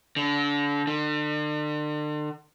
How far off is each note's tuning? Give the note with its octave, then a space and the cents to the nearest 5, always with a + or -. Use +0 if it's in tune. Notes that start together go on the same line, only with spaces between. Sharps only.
D3 -30
D3 +40